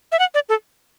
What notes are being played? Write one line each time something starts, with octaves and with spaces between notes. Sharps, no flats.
E5
F#5
D5
A4